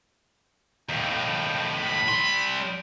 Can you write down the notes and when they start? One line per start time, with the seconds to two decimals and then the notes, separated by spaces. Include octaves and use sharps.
0.89 D#2 A2 G5
1.78 B5
2.09 G3 C6